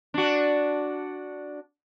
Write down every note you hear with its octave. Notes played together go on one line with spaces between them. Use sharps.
D4 F#4